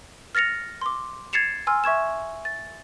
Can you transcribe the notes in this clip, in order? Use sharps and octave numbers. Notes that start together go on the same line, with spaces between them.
F6 A6 A#6 C#7 F7
C6 D6
G#6 A6 C7 C#7 E7 F7
G#5 C6 E6 F6
E5 C#6 G#6 E7
A6